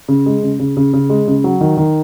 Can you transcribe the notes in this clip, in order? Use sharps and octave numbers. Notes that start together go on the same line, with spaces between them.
C#3
G#3
C#3
C#3
C#3
C#3
G#3
C#3
F#3
D#3
D#3